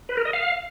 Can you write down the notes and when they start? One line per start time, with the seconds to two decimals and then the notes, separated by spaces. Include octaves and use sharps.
0.09 B4
0.17 A#4
0.25 D#5
0.33 F5